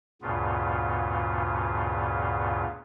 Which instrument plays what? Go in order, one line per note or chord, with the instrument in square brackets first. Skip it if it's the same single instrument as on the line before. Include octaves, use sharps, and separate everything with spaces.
[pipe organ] D2 G2 A#2 C#3 B3 F4